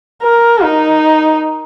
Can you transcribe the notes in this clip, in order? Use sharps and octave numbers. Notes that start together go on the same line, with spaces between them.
A#4
D#4